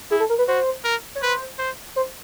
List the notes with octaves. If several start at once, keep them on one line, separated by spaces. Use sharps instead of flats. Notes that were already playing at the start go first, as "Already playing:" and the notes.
E4 G#4
A4
A#4
B4
F#4 C5
A#4
C#5
B4 C5
C5
C5